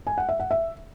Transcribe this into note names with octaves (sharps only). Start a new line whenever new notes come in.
G#5
F#5
E5
F#5
E5